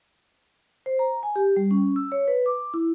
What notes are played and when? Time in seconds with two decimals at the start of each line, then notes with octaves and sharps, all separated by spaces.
0.86 C5
0.99 A#5
1.23 G#5
1.36 G4
1.56 G3
1.71 C#4
1.96 E6
2.12 C#5
2.28 B4
2.46 D6
2.74 E4